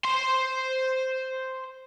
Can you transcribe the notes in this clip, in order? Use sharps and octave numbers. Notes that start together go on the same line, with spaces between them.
C5 C6